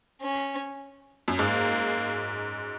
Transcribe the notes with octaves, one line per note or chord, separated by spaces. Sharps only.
C#4
F#2
G#2 A#3